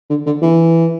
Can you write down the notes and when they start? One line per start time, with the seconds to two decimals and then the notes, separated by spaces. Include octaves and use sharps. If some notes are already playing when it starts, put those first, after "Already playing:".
0.09 D3
0.26 D3
0.42 E3